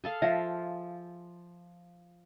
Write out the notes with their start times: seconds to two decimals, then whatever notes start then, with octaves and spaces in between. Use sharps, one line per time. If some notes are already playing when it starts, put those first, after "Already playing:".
0.04 G#4 A4 F5
0.22 F3 E5 F5